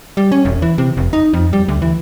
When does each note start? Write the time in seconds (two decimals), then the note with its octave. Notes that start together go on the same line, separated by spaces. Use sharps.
0.17 G3
0.32 C#4
0.45 E1
0.62 E3
0.78 C3
0.97 F1
1.13 D#4
1.33 F2
1.53 G3
1.68 D2
1.82 E3